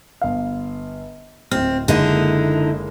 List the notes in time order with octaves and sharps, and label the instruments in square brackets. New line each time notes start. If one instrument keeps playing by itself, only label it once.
[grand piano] G1 F5
[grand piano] D1 F6 [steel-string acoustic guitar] C4
[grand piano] F#1 G#3 A#3 [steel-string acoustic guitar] D3 D#4 E4